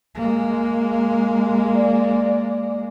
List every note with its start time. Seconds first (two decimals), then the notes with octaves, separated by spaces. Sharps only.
0.15 G#3 A#3
1.76 D5